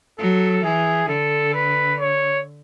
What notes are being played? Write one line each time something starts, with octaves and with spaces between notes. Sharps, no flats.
F#3 A4
E3 G#4
D3 A4
B4
C#5